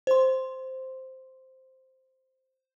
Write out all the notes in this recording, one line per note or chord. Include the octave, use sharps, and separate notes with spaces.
C5 C6